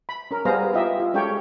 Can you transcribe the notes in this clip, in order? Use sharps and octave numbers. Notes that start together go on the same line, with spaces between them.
B5
C#4 A#4
G3 B3 G#4 C5 F5 A#5
E4 F4 G4 D#5 E5
F4
G#3 C#4 G4 A4 C#5 G5